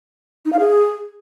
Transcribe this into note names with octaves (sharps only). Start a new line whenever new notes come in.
D#4
F5
G#4